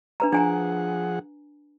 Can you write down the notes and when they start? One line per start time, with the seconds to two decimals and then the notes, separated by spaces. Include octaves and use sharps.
0.20 D4 B4 A#5
0.32 F3 D4 G#4 F#5 G#5 A#5